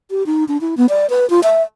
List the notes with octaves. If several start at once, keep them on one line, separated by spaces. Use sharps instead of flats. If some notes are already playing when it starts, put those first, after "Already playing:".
G4
D#4
D4
E4
B3
D5
B4
F4
E5